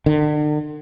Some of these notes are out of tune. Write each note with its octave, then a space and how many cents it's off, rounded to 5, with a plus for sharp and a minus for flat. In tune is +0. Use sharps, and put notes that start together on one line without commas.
D3 +40